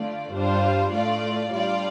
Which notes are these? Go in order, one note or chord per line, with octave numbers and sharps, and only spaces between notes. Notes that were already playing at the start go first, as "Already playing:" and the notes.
Already playing: D3 A3 F4 D5
G2 G3 D4 F4 C5
A2 A3 F4 D5
G3 D4 F4 D5